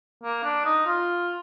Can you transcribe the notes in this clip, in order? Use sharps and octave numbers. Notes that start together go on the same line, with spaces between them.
A#3
D4
D#4
F4